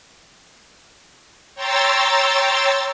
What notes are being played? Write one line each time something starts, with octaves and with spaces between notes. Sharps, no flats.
C#5 G5 A#5 C6 E6 A6